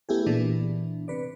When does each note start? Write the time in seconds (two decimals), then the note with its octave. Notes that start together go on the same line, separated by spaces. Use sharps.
0.09 A3 B3 E4 G4 G#4
0.26 A#2 E3 B3 D4
1.08 C3 B4 D5